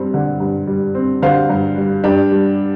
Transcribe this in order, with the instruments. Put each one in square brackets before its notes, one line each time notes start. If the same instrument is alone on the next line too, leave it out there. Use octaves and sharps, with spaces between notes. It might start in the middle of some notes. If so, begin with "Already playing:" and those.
Already playing: [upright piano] G2 G3 C4
D3
G2
G3
C4
D3 C5 F5
G2
G3
G2 D4 G4
G3